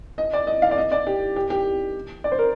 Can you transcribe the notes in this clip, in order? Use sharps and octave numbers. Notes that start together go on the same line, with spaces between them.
D#5
D5
D#5
F5
D5
D#5
D5
G4
G4
G4
D5
C5
A#4